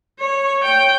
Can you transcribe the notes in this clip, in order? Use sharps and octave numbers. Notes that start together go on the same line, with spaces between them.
C#5
G5